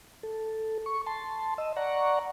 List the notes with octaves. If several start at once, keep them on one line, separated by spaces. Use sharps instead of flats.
A4
C#6
A5 C6
D#5 E6
D5 F#5 A#5 C#6